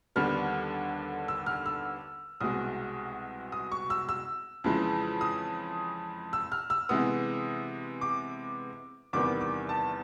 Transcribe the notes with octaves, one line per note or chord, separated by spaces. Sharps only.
D#2 D3 G3 B3 F6
E6
F6
E6
C2 B2 G#3 D#6
D#6
C#6
E6
E6
F2 C#3 E3 G#3
D#6
E6
F6
E6
C3 E3 G#3 B3 D#6
D6
E2 C3 D#3 G3 B3 D6
D6
A5